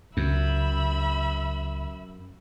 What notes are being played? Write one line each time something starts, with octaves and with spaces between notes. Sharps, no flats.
C#2 F#2 E5 B5